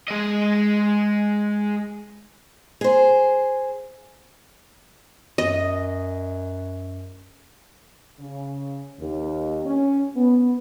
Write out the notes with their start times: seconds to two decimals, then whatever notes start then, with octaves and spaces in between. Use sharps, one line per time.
0.08 G#3 D#5
2.81 G#4 C5
5.38 F#2 D#5
8.20 C#3
9.00 D#2
9.66 C#4
10.16 B3